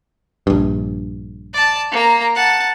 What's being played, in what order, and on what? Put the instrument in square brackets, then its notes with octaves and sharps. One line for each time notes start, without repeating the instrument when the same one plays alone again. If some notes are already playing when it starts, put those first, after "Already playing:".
[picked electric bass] A#1 G2
[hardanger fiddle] D5 A5
A#3 A#5
F#5 A5